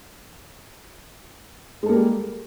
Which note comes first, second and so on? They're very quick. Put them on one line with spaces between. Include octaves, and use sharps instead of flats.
G#3 A4 A#3 G3